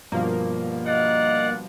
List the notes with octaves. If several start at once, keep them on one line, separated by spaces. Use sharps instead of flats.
G2 B2 F3 A#3
D5 D#5 F5 F#5